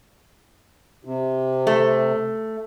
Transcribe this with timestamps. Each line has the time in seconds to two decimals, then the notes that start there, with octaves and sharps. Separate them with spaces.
1.05 C3
1.67 A3